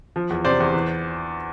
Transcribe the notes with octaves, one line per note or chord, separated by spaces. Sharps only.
F3
E2
C3 C5 D5
E2
E3